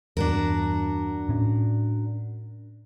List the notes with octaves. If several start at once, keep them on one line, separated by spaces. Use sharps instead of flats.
E2 G2 D4 F#4 A#4
A2 C#4